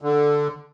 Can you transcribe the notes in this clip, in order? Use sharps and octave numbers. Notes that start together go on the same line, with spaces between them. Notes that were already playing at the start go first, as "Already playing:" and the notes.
D3